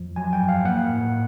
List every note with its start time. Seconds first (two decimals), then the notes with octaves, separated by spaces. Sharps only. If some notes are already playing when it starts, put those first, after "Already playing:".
Already playing: F2 F3
0.16 F#3 G#5
0.33 G5
0.41 G2
0.49 F5
0.65 A#3 F#5
0.89 A2